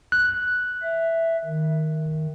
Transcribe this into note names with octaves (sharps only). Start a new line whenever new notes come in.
F#6
E5
D#3